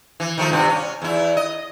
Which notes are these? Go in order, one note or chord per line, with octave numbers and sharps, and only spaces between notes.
E3
D#3 F3 A3
G2 C3 B3
C#4
E2 E4
D#5